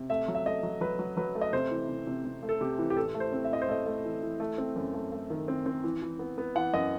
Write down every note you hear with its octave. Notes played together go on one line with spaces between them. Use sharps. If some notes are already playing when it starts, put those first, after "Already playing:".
Already playing: C3
A3 E5
F#3
E5
A3 D#5
F#3
F#3 B4
F#3
F#3 B4
A3
D#5
C3 C5
E3
C3
C3
C3
A3
A4
C3 G4
E3
G4
A2 A4
A3
C5
C4
E5
A2 D#5
C5
A3 D#5
A3
E3
E3
A3
C4
F#2
A3
A3
D#3
C4
C4
E3
E3
B3
B3
E3 F#5
F#2 D#5